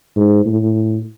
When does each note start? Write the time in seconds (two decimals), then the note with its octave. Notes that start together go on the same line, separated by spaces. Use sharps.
0.16 G#2
0.46 A2